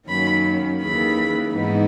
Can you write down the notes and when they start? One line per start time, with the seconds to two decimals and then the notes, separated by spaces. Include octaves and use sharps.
0.08 F#2 D#3 F#3 A#3 C#4 B5
0.81 D#2 C#3 E3 B5
1.54 G#2 E3 G#3 B3 D#4